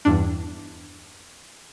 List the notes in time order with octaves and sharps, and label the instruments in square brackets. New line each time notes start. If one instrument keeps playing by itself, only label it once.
[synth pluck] E2 G2 D4